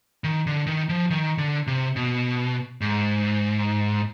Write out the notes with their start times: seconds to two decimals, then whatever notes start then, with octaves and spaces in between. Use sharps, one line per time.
0.24 D#3
0.47 D3
0.67 D#3
0.89 F3
1.10 D#3
1.38 D3
1.67 C3
1.96 B2
2.81 G#2